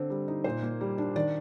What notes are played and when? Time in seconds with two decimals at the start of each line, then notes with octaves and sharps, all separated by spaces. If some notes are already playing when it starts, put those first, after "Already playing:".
Already playing: D3 C4
0.10 G3
0.28 D#4
0.44 A#2 C5
0.62 A#3
0.81 G3
0.98 D4
1.16 D#3 D5